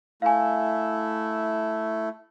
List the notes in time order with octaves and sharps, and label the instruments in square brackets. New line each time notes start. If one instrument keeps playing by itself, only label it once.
[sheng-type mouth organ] A3 E4 [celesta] F5 G#5